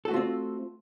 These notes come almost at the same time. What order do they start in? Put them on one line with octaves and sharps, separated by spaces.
A4 F#4 A3 F4 C4